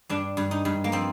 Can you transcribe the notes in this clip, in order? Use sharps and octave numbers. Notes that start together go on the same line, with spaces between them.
G2 D4
G2
D#4
G2
A#3
F3 C4